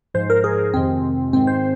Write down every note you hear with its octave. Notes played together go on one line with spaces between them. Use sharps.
G#2 F3 G#3 C5
A#4
G#4
F2 C3 D#3 G#3 C4
G#2 D#3 G#3 C4
C5